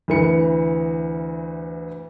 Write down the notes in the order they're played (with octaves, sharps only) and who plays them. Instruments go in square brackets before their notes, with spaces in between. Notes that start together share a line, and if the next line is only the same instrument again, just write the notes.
[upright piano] D2 E3 C#7